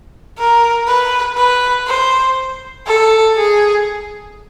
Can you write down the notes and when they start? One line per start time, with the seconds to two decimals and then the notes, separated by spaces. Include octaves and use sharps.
0.38 A#4
0.87 B4
1.37 B4
1.87 C5
2.87 A4
3.37 G#4